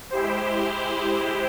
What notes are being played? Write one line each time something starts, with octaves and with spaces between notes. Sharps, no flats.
G#3 E4 G4 C5